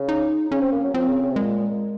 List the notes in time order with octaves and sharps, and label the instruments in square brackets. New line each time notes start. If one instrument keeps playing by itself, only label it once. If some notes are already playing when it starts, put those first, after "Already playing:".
Already playing: [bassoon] C#3
[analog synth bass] D#4
[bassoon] C#3 [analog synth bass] C#4
[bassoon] C4
A#3
F#3
[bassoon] F3 [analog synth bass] C4
[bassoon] C#3
C#3
C3
[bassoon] A#2 [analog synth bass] G#3